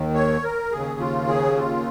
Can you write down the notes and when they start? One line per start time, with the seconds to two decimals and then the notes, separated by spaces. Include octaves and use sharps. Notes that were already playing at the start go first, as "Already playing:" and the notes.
Already playing: D#2 D#3
0.14 C#5
0.44 A#4
0.72 D#2 C#3 G#4
1.00 F4
1.28 G#4
1.57 F4